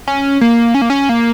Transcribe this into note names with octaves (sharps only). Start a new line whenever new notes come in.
C#4
A#3
C#4
A#3
C#4
A#3